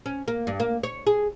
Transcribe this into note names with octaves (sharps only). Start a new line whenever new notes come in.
C#4
A#3
G2
A#3
C#5
G#4